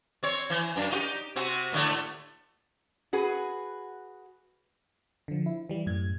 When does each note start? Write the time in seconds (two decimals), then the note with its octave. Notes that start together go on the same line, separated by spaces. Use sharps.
0.23 C4 C#5
0.50 E3
0.76 F#2 D4
0.90 D#4 F4 G4
1.36 C3 C4 F#4
1.72 A2 D3 A3
3.13 F#4 G#4 B4
5.28 D3 F3
5.46 E4
5.69 E3 G3
5.86 F#2 A2 G#6